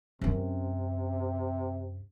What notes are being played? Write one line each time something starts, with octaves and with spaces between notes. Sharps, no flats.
F#2 C3 C#4